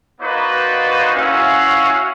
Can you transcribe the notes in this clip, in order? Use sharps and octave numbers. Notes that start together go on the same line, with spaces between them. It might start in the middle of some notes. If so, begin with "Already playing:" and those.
A#3 D#4 F#4 B4 C5 D5
C#4 E4 F#4 F5